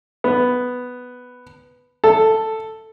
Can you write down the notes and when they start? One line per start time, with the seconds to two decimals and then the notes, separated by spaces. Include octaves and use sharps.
0.24 B3
2.04 A4